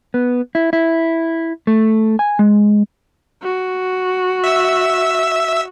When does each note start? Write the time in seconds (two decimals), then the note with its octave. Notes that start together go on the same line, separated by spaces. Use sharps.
0.14 B3
0.55 E4
0.73 E4
1.67 A3
2.19 G#5
2.39 G#3
3.42 F#4
4.44 E5 E6